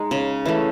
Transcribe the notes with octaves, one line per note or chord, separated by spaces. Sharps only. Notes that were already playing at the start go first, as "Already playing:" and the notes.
Already playing: G#3 D#4
C#3
E3 A3